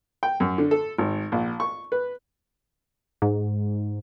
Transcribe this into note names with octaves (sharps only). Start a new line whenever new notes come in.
G5
F#2
D3
A4
G#1
A#1
C#6
B4
G#2